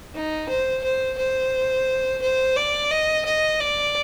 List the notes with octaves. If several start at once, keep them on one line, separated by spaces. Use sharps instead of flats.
D#4
C5
C5
C5
C5
D5
D#5
D#5
D5